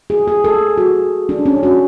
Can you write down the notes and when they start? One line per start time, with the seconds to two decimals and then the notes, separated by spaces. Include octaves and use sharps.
0.10 G#4
0.28 G#4
0.44 A4
0.78 F#4
1.29 D4
1.46 C#4
1.63 F#4